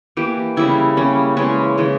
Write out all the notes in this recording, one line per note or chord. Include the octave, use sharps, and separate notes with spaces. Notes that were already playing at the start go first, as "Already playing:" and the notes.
E3 A#3 G4
C#3 G3 A#3 E4
C#3 G3 A#3 C#4
C#3 E3 G#3 C#4
C#3 E3 G#3